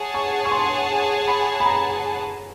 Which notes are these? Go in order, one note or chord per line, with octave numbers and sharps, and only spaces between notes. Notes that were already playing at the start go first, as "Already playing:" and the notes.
Already playing: G#4 C#5 F#5 A5
C#6
C#6
C6
B5
B5
A#5